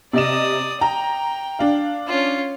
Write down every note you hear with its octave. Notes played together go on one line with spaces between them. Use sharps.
C3 D5 D#5 D#6 E7
G5 A#5
D4 F5
C#4 F4